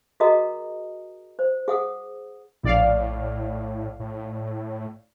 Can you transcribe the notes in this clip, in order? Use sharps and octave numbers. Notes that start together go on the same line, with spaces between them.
F#4 G#4 A#4 D#5 A#5 D#6
C5
G#4 F#5 D#6
A#1 A2 D5 F5
A2